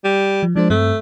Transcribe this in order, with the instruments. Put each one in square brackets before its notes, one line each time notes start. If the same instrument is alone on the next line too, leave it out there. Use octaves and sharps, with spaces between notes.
[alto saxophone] G3
[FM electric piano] F3
[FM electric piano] F3 G#3 C5 [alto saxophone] D4
[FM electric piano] G2 C4 [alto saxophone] A3